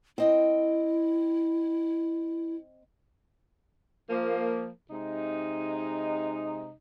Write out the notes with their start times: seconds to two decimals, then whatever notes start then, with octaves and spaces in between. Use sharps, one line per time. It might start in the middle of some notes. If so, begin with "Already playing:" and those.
0.18 C4 E4 D#5 G5
4.09 F3 A#3
4.90 C3 G#3 D#4